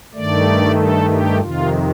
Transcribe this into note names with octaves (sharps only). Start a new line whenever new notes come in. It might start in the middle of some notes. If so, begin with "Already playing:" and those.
G2 D#3 A3 D5
A4
G4
F2 C3 D#3 F4